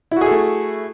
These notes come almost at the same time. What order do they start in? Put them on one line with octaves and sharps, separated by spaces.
E4 F#4 G#4 A4 A3